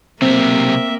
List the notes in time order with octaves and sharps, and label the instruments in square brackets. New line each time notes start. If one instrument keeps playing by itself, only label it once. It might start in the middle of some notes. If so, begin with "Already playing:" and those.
[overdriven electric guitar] B1 C3 [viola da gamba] A#3 [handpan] C4 [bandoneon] E5